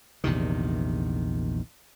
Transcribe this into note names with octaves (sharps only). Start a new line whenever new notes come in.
A#1 E2 C3 D#3